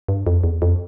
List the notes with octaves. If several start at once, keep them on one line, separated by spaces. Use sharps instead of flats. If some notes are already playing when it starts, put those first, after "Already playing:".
G2
F2
E2
F2